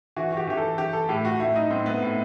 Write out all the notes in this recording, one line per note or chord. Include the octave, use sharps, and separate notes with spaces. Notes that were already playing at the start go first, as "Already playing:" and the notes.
E3 F#4
F#4
G4
E3 G4
A4
E3 G4
A4
A2 G4
F#4
A2 E4
D#4
A2 C4
B3
A2